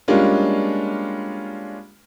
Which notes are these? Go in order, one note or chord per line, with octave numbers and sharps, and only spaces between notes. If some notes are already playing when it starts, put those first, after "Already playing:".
G3 G#3 A#3 C#4 D4 F4